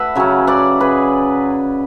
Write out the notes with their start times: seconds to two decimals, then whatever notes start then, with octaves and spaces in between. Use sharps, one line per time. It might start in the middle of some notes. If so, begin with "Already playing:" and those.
Already playing: A3 B4 E5 F#5
0.15 C#3 F#3 C#4
0.47 D5 F#5
0.80 G#4 B4